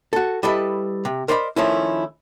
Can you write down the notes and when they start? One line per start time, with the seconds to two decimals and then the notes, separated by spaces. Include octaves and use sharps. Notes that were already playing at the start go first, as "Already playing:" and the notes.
0.13 F#4 A4
0.43 G3 E4 A4 B4 D#5
1.05 C3
1.28 A#4 C5 D5 D#5 G5 B5
1.56 D#3 F3 A3 C#4 E4